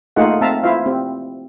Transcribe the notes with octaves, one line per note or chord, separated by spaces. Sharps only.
A3 A#3 D#4 F4 G#4 F#5
C4 E5 F5 A5 A#5
E4 F4 C5 E5 F5
C4 G4